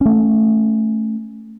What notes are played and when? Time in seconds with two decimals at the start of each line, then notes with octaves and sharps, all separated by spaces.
0.01 A3 C#4